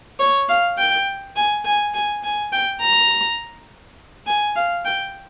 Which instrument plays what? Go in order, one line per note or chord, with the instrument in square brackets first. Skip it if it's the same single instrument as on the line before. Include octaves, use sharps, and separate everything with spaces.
[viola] C#5
F5
G5
G#5
G#5
G#5
G#5
G5
A#5
G#5
F5
G5